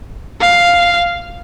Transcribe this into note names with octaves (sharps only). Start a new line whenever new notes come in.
F5